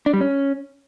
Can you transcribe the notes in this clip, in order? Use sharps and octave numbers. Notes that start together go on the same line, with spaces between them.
D4
G3
C#4